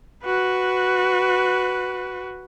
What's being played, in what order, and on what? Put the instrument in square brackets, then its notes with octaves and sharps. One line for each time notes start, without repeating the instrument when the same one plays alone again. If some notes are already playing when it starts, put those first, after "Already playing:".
[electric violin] F#4 B4